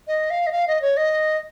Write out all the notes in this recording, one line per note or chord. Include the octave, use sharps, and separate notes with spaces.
D#5
F5
D#5
F5
D#5
C#5
D#5